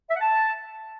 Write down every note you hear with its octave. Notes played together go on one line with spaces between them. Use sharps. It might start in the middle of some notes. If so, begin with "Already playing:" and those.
E5
F#5
A5